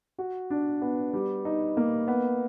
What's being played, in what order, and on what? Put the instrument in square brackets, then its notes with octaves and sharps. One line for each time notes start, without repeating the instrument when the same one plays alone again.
[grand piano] F#4
D4
B3
G3
D#4
A#3
B3